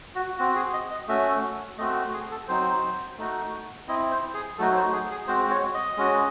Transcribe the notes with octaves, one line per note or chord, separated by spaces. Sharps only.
F#4
C4 F#4
G#4
D#5
D#5
A3 C#4 F#4 E5
A3 C4 F#4 D#5
G#4
A4
F#3 C4 D#4 C5
A3 D#4 F#4
C4 E4 D#5
C5
G#4
F#3 A3 D#4 F#4 A4
C#5
C5
G#4
G#4
G#3 C4 F#4 C5
C#5
D#5
G#3 C#4 F#4